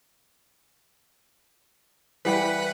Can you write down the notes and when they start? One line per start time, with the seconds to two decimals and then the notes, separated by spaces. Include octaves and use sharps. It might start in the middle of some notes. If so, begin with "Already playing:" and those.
2.25 E3 G3 B4 F#5 B5